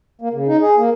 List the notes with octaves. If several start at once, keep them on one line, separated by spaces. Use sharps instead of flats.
A#3
C#3
D#4
G#4
A#3